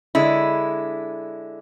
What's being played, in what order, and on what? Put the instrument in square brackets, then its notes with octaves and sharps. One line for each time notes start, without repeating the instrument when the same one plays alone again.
[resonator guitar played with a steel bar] D3 G#3 E4